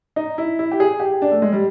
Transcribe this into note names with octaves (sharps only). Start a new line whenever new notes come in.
D#4
E4
E4
G4
G#4
G4
D4
A3
G#3
G3